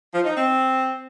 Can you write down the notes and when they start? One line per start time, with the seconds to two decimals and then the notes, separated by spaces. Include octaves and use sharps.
0.13 F3
0.24 D#4
0.36 C4